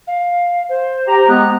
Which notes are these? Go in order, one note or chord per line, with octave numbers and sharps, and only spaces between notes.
F5
C5
G4 A#5
G#3 B3 F#6